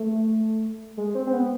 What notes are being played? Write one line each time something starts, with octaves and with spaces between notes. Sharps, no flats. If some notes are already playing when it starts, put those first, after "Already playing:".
Already playing: A3
G#3
C4
C4
B3